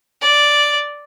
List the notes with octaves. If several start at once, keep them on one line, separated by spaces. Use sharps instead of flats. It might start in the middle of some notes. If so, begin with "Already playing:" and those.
D5